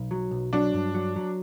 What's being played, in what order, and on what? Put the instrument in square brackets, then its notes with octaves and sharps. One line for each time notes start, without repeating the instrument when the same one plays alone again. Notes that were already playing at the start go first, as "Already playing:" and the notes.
Already playing: [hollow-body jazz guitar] B1
F#3
B1
[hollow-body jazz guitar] F#3 [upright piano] D4
[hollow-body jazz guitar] G2
F#3
F#3